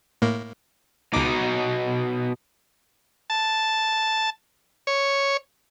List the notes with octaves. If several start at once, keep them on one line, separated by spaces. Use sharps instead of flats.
A2 A#3
C#2 B2 D#4 D6
A5
C#5